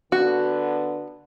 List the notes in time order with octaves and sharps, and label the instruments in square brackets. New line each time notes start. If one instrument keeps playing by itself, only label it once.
[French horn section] D3 B3 [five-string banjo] F#4